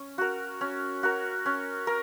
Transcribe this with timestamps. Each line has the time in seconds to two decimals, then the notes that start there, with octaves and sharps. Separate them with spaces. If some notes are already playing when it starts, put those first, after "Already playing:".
Already playing: C#4
0.18 F#4 A#4
0.61 C#4
1.03 F#4 A#4
1.46 C#4
1.87 A#4